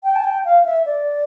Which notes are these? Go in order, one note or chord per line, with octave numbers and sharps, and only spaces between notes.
G5
A5
G5
F5
E5
D5